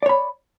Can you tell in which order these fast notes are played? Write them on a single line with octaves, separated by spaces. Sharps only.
D5 C#5 B5